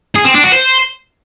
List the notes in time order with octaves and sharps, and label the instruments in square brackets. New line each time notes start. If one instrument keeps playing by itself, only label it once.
[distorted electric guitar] G#4
C4
D4
F#4
C5